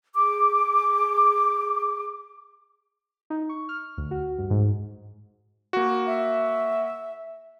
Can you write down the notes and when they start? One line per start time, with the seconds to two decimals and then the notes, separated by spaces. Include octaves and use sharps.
0.14 G#4 D6
3.30 D#4
3.49 C#6
3.69 F6
3.98 D2
4.11 F#4
4.38 G2
4.50 G#2
5.73 A#3 F#4
6.07 E5